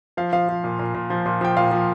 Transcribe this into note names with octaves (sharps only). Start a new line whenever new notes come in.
F3 F5
F3 F5
F3
A#2
A#2
A#2
F3
A#2
F3 G5
A#2 F5
F3